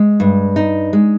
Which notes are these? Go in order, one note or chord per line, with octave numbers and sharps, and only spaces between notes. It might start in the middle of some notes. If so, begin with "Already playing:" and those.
Already playing: G#3
G2
D#4
G#3